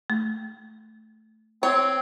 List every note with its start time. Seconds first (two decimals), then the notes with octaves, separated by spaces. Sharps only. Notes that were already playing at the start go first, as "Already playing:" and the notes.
0.10 A3
1.63 C4 C#5